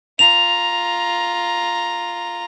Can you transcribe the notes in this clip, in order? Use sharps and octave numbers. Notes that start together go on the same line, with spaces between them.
F4 A#5 F7